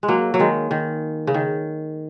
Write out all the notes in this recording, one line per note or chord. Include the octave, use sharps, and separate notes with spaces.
G#3
F#3 A#3
F#3
D#3 G#3
D#3
C#3
D#3